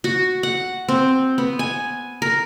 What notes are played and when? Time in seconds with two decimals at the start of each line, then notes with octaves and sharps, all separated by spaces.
0.04 F#4
0.43 F#5
0.88 C4
1.38 B3
1.59 G#5
2.22 A#4